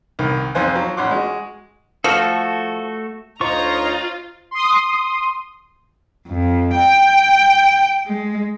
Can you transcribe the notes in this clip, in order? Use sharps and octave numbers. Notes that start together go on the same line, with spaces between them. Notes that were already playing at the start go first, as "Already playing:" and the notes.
C2 D#3
F2 F3 F4 C5 G#5 F#6
F3 F#3
A1 C#5 F#5 C6 D6
G#3 F#4
F3 A3 F#4 A4
D2 D#4 F4 C5 C#5 D#5 A#5 C#6
C6 D#6
F2
G5
G#3